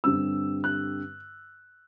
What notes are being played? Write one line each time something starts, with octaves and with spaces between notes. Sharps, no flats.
G2 D3 G3 C4 E6
F#6